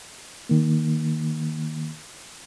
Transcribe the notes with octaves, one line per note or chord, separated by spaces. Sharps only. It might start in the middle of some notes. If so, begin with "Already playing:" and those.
D#3 A#3